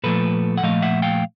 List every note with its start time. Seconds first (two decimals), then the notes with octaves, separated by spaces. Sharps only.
0.03 A#2 F3 A3 A4 B4
0.58 F#5
0.63 A#2 F3 A3 D#5 F5
0.82 E5 F#5
1.02 F5 G5